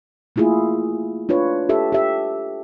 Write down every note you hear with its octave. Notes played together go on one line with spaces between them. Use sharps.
A3 A#3 E4 F4 G#4
D4 F4 B4 C#5
G4 A4 E5
G4 E5